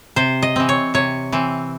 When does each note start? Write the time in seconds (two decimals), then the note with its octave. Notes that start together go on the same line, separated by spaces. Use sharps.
0.16 C3 C5
0.43 D#5
0.56 E3 C4
0.69 C#5
0.94 C3 C#5
1.32 E3 C4